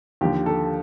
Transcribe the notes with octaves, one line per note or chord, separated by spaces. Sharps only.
D#2 D3 F3 G4
A4